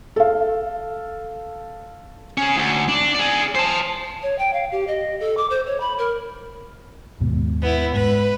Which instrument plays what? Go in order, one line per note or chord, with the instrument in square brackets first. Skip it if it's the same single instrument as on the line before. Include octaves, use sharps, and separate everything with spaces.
[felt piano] A4 F5
[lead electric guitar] C#4 G#4
D2
D4
G#4 D5
C5 A5
[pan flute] C#5
G5
F5
G4
D#5
A4
D6
C5
C#5
B5
A#4
[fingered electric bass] D#2 G#2 B2
[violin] B3 E4
[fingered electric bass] G#2 [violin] B4